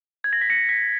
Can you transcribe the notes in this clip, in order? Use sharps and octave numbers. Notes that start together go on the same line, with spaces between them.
G#6
A#6
B6
A#6 C#7
B6